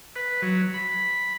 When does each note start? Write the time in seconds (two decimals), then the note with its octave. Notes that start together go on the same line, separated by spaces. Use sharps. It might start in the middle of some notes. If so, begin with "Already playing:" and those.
0.16 B4
0.42 F#3
0.74 B5